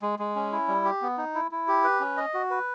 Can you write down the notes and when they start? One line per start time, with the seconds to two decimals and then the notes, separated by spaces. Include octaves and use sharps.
0.02 G#3
0.19 G#3
0.36 C#4
0.52 E4
0.68 G3
0.85 G4
1.02 B3
1.18 D#4
1.35 E4
1.51 E4
1.68 G4
1.84 B4
2.00 C#4
2.17 D#5
2.34 F#4
2.50 B4